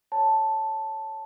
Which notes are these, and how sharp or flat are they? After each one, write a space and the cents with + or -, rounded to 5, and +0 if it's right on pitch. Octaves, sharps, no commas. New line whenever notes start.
C#5 +0 A5 +0